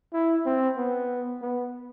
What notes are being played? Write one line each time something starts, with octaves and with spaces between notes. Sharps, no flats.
E4
C4
B3
B3